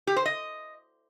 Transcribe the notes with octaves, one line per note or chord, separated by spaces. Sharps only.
G4
C5
D#5